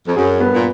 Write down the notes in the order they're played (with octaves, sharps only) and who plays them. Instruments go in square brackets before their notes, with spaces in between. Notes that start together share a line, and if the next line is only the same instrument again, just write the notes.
[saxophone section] F2
[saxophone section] F#2 [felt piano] G#4
[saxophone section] G2 [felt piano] B3
[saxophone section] A#2